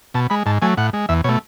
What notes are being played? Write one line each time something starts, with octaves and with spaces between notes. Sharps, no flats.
B2 A5
G#3 B5
G#2 A5
F#3 A3 G#5
A2 F#5
G#3
E2 E5
B2 A3 C#5